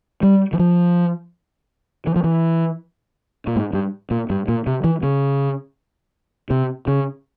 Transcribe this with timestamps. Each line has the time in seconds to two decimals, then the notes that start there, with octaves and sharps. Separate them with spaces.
0.23 G3
0.53 E3
0.59 F3
2.07 E3
2.16 F3
2.24 E3
3.47 A#2
3.56 G#2
3.73 G2
4.11 A#2
4.30 G2
4.48 A#2
4.67 C3
4.84 E3
5.03 C#3
6.50 C3
6.88 C#3